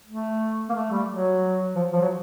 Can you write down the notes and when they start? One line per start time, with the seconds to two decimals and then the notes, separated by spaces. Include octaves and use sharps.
0.07 A3
0.69 A#3
0.74 A3
0.91 G3
1.08 F#3
1.75 F3
1.93 F3
2.01 F#3